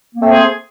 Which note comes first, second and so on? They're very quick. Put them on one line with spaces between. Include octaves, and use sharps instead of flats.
A#3 C4 A3 C5 G#4